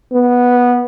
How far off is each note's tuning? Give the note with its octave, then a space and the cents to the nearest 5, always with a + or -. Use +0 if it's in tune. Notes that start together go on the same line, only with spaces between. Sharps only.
B3 -10